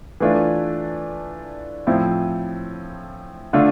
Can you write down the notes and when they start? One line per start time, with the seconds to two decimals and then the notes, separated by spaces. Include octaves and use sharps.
0.20 E3 A3 D4 F4
1.87 A2 F3 C4 E4
3.53 D3 A3 D4 F4